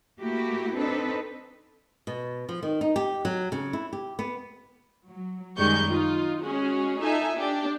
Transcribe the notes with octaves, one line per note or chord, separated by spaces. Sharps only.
A3 A#3 E4 F#4 G4
C4 D4 D#4 A4 B4
B2
F3
D#3
D#4
G4
F#3
C#3
E4
G4
B3
F#3
F#2 D#3 G3 G#3 C#6 G6
D#4 F4
G#3 C#4 F#4 G#4
D#4 F4 A4 E5 G#5
D4 G4